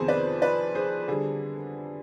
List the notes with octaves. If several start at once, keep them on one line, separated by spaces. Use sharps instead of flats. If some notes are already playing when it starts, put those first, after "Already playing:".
Already playing: F2 C3 D#3 B3 G#4 C5
B4 D5
B4 D5
G#4 C5
D3 G3 D4 G#4